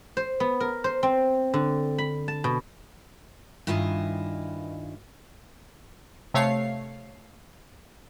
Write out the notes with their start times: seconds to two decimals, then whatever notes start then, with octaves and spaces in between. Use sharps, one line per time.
0.17 C5
0.40 B3
0.60 A#4
0.84 C5
1.03 C4
1.54 D3
1.98 B5
2.28 A5
2.44 B2
3.67 G2 D#3 E4 F4 D#5 G#5
6.34 C3 A3 C#5 F5 C7